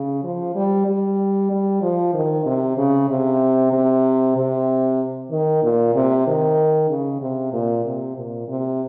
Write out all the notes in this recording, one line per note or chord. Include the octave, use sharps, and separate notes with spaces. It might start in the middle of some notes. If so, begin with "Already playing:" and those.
Already playing: C#3
F3
G3
G3
G3
F3
D#3
C3
C#3
C3
C3
C3
D#3
A#2
C3
D#3
C#3
C3
A#2
C3
A#2
C3